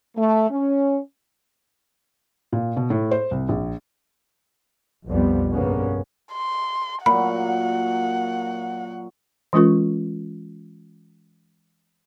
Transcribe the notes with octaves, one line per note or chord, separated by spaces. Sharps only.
A3
C#4
A#2
B2
A2
C5
C2
A#1
B1 F2 G3 B3
G2 C#3 A#3 B3 C#4
C6
A#2 F#3 F#5 B5
E3 G#3 C#4 F4 A#4 C#6